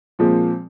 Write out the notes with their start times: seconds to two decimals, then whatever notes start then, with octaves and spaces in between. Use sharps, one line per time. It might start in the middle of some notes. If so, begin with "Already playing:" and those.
0.19 A#2 F3 G#3 C4